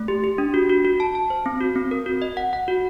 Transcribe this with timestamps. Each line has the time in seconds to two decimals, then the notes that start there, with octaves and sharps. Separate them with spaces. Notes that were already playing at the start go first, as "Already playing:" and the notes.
Already playing: A3
0.08 G4
0.24 G4
0.38 D4
0.54 F#4
0.69 F#4
0.85 F#4
1.00 A5
1.15 A5
1.30 C5
1.46 C4
1.61 F#4
1.75 C4
1.91 A#4
2.06 F#4
2.22 D#5
2.37 F#5
2.53 F#5
2.68 F#4